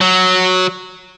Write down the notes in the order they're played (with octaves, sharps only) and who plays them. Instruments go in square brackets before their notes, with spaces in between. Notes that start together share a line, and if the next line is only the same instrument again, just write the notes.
[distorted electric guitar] F#3